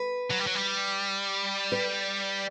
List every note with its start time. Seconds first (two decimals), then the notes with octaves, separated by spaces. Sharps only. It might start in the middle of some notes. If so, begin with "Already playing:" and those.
Already playing: B4
0.31 F#3
0.39 G3
0.47 F#3
0.55 G3
1.72 B4